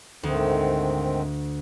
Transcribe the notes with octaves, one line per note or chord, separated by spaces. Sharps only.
D2 G#2 D#3 C4